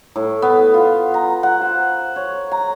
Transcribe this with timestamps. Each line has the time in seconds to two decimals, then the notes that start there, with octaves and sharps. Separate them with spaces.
0.16 A2
0.42 B3
0.74 F4
1.14 A#5
1.43 F#5
1.61 C5
2.16 C#5
2.52 A#5